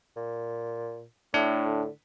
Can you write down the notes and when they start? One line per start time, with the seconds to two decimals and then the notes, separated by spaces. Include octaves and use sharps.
0.17 A#2
1.34 A2 A3 D4
1.67 D3